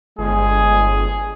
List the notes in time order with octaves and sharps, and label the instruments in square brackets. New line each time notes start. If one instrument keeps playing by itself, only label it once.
[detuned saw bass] G1 [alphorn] G#3 [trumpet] G#4